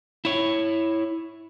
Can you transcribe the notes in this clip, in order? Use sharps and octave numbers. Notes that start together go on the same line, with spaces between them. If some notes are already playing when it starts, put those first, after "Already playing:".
E4 C#5